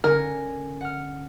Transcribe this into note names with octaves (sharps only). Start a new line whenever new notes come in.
D3 C#4 A#4 G#5
F#5 F6